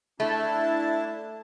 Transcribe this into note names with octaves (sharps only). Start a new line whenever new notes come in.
A3 D4 E4 A5